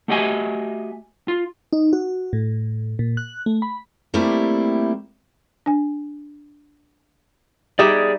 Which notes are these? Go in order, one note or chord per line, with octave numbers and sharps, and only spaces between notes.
A3 F#4 G4 D#5 E5 G#5
F4
D#4
F#4
A2
A#2
F#6
A3
B5
G3 A3 A#3 C4 E4 G4
D4 G#5
G3 D#4 G#4 D5 E5